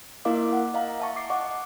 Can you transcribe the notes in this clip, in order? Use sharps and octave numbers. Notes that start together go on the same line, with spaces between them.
A#3 E4 A#4 D#5 F5 D6
F#5
D#5 F5 A#5
E5 A5 C#6
D6 C7
D#5 F#5 C#6 D6